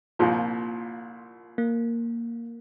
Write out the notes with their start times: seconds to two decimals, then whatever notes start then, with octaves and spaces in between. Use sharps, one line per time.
0.19 C2 A#2 F3 A#3
1.58 A#3